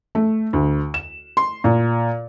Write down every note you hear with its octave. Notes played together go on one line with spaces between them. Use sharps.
A3
D2
E7
C6
A#2